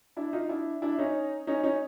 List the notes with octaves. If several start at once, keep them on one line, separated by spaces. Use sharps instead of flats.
D4 E4
D#4 F4
D4 E4
D4 E4
C#4 D#4
C#4 D#4
C#4 D#4